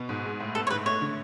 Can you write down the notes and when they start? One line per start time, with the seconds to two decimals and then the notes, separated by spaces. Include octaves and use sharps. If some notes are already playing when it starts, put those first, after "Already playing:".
Already playing: B2 B3
0.09 G#2
0.25 G#3
0.40 A2
0.55 B3 A4
0.67 C#5
0.70 G#2 B4
0.86 A3 C#5
1.01 D3